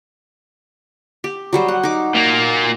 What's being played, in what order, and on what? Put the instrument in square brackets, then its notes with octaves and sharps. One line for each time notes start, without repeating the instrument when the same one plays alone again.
[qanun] G4
F#3 G3 C5
F#5
D#4 D6
[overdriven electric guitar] A#2 A#3